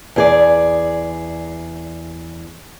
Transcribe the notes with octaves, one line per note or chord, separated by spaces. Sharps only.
E2 G#4 D5